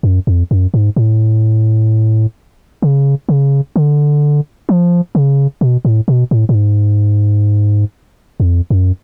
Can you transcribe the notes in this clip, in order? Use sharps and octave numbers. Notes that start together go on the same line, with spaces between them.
F#2
F2
F#2
G#2
A2
C#3
C#3
D3
F3
C#3
B2
A2
B2
A2
A2
G#2
F2
F#2